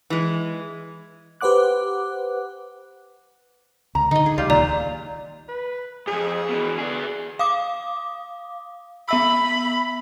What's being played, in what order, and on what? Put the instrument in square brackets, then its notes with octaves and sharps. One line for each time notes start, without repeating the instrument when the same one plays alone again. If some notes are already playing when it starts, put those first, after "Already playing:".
[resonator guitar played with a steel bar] E3 G#3
[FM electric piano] G4 B4 C5 F#5 D6 F#6
[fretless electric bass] C#2 [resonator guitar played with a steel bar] A#5
[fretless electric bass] D3 [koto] D#4 D#5
[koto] G#4
[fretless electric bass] C#2 [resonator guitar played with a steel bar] G3 [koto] F4
[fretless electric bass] D1 D#3 [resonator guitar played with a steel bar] A#2 [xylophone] D5 A#5
[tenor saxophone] B4
[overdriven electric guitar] F2 G#2 [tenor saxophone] G#4
[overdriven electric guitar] B2 E3
[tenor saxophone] D3 [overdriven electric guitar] B3 G#4
[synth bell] F5 D6 D#6
[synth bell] B3 E5 E6 [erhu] B5